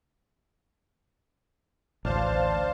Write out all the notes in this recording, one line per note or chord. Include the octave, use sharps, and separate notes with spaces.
A1 D2 D4 C5 F5 A5